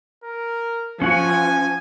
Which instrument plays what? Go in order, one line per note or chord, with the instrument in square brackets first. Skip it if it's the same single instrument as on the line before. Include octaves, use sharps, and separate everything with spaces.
[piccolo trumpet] A#4
[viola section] F3 [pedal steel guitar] C#4 F#5 C#6 [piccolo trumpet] G#5